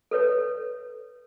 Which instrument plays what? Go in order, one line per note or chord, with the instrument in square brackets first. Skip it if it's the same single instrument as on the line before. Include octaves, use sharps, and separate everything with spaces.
[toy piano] A4 B4 C#5